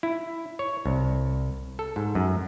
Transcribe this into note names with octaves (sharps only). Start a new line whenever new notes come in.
E4
C#5
C2
A4
G#2
F#2